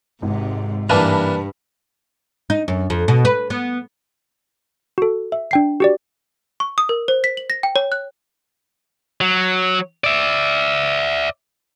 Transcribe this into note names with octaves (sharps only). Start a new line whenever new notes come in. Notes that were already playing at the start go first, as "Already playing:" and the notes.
G#1 G#2 C3
G2 E3 A#3 D4 B4 A5 B5
D#4
F#2
F2
B2
B4
B3
F#4 A4
E5
D4 G5 C7
F#4 G4 D5
C#6
D#6
A#4
C5
B6
F#7
A#6
G5
C#5
F#6
F#3
D5 E5